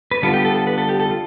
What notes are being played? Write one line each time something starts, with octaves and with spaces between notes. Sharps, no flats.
B4
D3 G3 B3 F4 A4
G4
A4
A4
B4
A4
G4
A4
F4